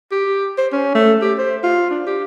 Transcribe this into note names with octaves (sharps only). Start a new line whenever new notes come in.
G4
C5
C#4
A3
G4
C5
F4
D4
G4